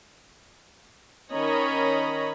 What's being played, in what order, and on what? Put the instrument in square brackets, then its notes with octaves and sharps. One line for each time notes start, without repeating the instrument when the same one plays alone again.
[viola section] D#3 C#4 C#5 D#5 A#5 B5